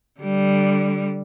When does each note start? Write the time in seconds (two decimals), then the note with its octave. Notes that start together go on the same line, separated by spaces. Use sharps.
0.20 D3 G3